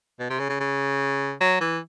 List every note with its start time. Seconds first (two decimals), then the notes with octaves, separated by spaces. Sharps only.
0.19 B2
0.30 C3
0.39 C#3
0.49 C#3
0.60 C#3
1.40 F#3
1.60 E3